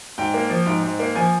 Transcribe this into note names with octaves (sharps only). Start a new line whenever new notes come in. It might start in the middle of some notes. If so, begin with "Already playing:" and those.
G#2 G5
A#3
F3
G#2
G#2
A#3
F3 G#5